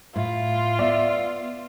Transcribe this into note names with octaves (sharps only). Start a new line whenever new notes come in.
A2 F4
B3 D5 E5